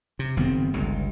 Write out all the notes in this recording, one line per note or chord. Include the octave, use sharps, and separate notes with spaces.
C3
F#1 D#3 B3 C4
G1 C#2 G2